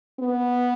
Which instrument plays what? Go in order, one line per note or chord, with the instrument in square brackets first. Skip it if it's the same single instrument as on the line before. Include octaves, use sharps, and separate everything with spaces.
[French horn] B3